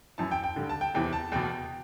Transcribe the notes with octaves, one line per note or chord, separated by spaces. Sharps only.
F#2 E3 A5
G5
G5
G2 D3
A5
G5
E2 C3 E3 G5
A5
E2 B2 G5